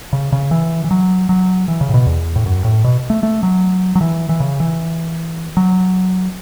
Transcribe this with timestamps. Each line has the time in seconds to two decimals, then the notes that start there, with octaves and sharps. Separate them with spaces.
0.13 C#3
0.32 C#3
0.51 E3
0.84 E3
0.91 F#3
1.29 F#3
1.68 E3
1.81 C#3
1.89 A2
1.94 B2
2.06 E2
2.36 A2
2.46 F#2
2.65 A2
2.84 B2
3.10 A3
3.23 A3
3.43 F#3
3.95 F#3
4.01 E3
4.29 E3
4.40 C#3
4.60 E3
5.57 F#3